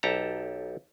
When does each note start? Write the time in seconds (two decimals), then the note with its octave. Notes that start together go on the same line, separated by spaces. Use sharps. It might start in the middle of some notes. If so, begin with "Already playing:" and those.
0.03 B1 G4 A4 A5 A#5